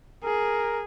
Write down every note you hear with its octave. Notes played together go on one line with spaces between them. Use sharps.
G#4 A#4